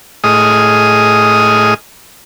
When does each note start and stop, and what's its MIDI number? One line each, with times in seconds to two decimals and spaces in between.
0.24 1.74 45
0.24 1.74 68
0.24 1.74 75
0.24 1.74 87
0.24 1.74 89